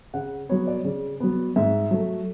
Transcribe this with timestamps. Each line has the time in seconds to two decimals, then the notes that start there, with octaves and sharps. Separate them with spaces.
0.14 C#3 F#5
0.49 F#3 B3 C#5
0.67 D5
0.84 C#3
1.20 F#3 B3
1.56 G#2 E5
1.91 F#3 A3